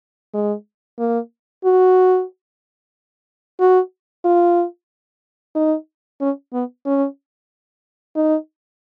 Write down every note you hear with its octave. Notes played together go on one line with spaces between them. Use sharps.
G#3
A#3
F#4
F#4
F4
D#4
C#4
B3
C#4
D#4